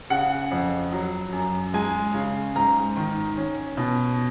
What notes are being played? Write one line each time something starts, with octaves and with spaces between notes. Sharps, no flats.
C#3 F#5
F2
F#3
F#2
G#3 G#5
C#3
G#2 A#5
D#3
C#4
B2